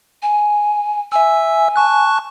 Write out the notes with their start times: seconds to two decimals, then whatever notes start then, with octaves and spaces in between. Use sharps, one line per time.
0.23 G#5
1.12 E5 G#5 E6
1.76 A5 C#6 F#6